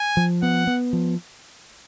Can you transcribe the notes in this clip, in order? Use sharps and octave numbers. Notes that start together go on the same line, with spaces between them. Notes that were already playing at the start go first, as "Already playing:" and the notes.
Already playing: G#5
F3
B3 F#5
B3
F3